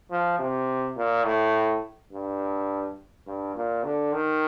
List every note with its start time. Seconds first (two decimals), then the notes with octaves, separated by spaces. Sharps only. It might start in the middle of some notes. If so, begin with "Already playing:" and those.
0.11 F3
0.39 C3
0.96 A#2
1.25 A2
2.13 G2
3.27 G2
3.56 A#2
3.84 D3
4.13 D#3